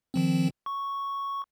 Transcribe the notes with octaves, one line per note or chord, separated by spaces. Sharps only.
D#3 F3 C4
C#6